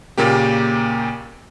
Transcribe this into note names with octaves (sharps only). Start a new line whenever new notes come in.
A#2 C#3 A#3 G4